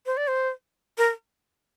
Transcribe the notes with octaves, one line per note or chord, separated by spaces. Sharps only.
C5
D5
C5
A#4